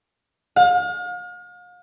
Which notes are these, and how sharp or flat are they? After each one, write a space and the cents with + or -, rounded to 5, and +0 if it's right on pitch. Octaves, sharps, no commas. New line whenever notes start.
F5 +40